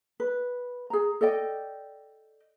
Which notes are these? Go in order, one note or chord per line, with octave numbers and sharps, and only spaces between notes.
B4
G#4 A#5
A4 D5 D#5 G5